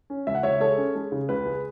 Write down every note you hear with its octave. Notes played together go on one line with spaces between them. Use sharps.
C#4
C#2 E5
F#5
C#2 C#5 E5
G#3 A4 C#5
C#4
G#3
C#3
C#2 B4
G#3